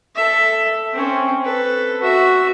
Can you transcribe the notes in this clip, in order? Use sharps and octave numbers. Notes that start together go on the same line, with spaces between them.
A4 E5
C4 C#4
A4 B4
F#4 E5